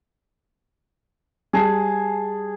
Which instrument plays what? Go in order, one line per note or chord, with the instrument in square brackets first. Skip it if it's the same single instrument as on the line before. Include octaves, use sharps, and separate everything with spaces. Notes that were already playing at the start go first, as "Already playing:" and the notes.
[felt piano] G3 A5 C7 [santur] G#4